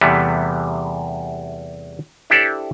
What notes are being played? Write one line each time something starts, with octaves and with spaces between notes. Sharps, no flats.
E2 C3 E3 G3 A3 B3
D4 E4 G4 A4 C5 D5